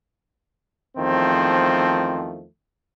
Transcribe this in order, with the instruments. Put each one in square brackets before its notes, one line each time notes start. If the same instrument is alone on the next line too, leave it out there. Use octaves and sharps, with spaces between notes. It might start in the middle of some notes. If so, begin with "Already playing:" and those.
[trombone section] E2 D#3 F3 A3 C4